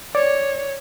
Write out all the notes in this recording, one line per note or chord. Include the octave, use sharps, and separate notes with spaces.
C#5 D5